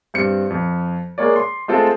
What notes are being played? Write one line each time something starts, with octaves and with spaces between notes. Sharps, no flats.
G2 C4 C#7
F2
G#3 A#3 C#5 D5
C6
G#3 A3 C4 F4 A4